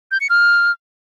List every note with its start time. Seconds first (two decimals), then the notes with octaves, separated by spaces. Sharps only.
0.11 G6
0.21 C#7
0.30 F6